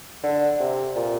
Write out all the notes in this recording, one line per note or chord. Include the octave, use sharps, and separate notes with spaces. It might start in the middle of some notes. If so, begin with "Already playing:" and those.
D3
C3
A#2